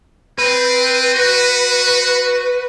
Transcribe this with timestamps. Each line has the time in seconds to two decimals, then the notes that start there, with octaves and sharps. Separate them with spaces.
0.39 C4 B4
1.15 F#4